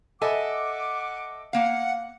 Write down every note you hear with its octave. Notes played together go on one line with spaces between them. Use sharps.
A4 D#5 E5 F#5 G#5 D6
A#3 F5 F#5